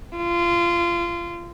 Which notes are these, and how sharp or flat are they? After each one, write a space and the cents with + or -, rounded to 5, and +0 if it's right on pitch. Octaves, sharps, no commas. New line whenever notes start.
F4 -25